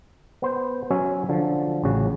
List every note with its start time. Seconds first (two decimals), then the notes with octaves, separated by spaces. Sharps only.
0.42 B3 C5
0.91 F#3 C#4 C#5 E5
1.29 D3 F3
1.83 A1 C#3 F#4